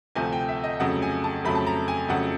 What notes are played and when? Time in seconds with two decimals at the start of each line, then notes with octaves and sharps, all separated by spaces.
0.15 D2 C3 F3 A3 G#5
0.33 G5
0.49 E5
0.64 D#5
0.80 F2 C#3 F#3 A3 F#5
1.02 G#5
1.24 A5
1.45 F2 C#3 F#3 A3 B5
1.55 A5
1.67 A#5
1.88 G#5
2.09 F2 C#3 F#3 A3 F#5